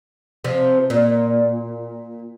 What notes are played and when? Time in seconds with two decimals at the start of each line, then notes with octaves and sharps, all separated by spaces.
0.44 C3 F3
0.90 A#2